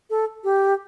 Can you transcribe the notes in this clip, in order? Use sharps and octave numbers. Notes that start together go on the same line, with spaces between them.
A4
G4